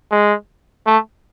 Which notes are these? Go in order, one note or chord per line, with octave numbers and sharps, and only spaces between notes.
G#3
A3